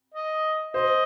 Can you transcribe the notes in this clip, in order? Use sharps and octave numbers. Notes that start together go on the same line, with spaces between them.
D#5
C5 D#5